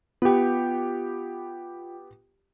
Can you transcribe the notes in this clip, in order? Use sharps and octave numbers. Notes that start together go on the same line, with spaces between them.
B3 F4 G4 G5